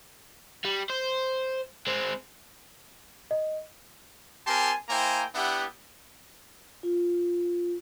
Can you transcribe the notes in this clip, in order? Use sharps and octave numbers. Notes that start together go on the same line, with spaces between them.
G3
C5
G#3 C4
D#5
C4 G4 A#4 G#5 A5 C6
A#3 E4 C5 G5 G#5 A#5
B3 D4 E4 G4 E5 F#5
F4